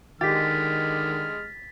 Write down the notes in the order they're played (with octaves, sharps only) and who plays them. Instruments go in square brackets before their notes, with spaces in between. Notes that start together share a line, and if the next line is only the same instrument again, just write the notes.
[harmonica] D3 G#3 F6 [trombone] D#3 [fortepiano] G4 [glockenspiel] A6 B6